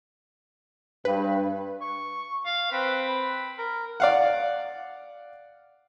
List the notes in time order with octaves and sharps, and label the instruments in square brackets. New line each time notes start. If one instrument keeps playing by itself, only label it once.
[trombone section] G2 [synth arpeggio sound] B4
[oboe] C#6
[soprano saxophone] F5
[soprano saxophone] C4 [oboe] B4
[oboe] B5
[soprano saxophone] A#4
[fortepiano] D5 F5 F#5